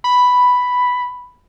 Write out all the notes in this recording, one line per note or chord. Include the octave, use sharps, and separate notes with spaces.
B5